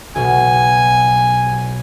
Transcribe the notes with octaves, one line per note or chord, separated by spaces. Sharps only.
B1 B2 G#5